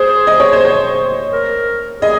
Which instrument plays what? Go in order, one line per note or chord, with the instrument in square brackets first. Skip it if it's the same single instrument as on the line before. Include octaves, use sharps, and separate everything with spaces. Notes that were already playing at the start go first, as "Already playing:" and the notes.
Already playing: [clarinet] G#4 [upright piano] C5
[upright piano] D#5
C#5
C5
C#5
[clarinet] A#4
[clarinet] G#4 [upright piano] D#5